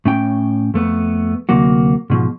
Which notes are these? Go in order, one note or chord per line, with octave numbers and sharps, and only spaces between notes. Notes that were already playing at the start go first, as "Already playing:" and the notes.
A2 C#4 G5
F2 A3 B3
D2 C3 F#3 A#3 F#4
G#2 B2 F3